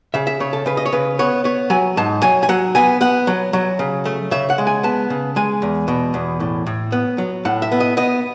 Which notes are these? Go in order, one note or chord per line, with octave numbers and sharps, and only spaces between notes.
C#3 E5
E5
C#3 C#5
A4
C#3 B4
D#5
C#5
C#3 B4
B3 C#5
B3 C#5
F#3 G#5
G#2 A5
F#3 G#5
G#5
F#3 F#5
B3 G#5
B3 F#5
F#3
F#3
C#3
A3
C#3 E5
F#5
G#3
G#5
B3 A5
C#3
G#3 G#5
E2
B2
E2
A2
A2
B3
F#3
A2 F#5
E5
B3
D#5
B3 D#5